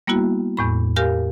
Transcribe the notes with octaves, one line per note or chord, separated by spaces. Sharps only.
G3 A#3 B3 E4 F#4
E2 A2 B5
G4 A#4 F5 G#5 F6